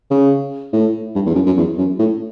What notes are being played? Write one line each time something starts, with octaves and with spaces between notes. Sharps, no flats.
C#3
A2
G2
E2
F#2
F#2
E2
F#2
A2